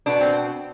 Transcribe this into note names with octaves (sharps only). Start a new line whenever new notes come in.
B2 B3 D4
C4